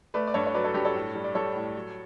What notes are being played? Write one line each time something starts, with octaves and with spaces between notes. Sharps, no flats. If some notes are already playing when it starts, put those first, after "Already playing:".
A3 B4 D5
D5
G2 A4 C#5
C#5
F#3 B4 D5
A4 C#5
G2 G4 B4
A4 C#5
A2
G3
D5
G3 A4 C#5
A2
F#3